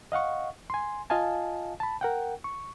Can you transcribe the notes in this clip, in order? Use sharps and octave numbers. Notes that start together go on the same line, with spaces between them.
D#5 F5 F#5 C#6
G#5 C6
F4 D#5 F5 G#5 A5
A5 B5
A#4 F#5 G5
C#6